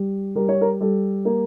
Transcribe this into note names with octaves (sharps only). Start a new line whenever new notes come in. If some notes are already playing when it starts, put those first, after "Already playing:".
Already playing: G3
G3 A#4
C#5
A#4
G3 A4
A#3